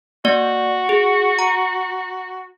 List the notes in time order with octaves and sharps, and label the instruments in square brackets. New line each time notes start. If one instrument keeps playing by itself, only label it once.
[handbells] A#3 D5 [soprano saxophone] F#4
[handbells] G#4
A#5